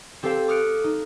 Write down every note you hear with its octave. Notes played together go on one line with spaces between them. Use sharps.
C4 G4 A4 C5 F5 G5
D6 D#6 F6 F#6 C#7 D7
D#4